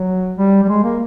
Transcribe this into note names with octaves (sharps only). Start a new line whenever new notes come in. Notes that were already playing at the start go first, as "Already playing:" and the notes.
Already playing: F#3
G3
G3
G#3
A#3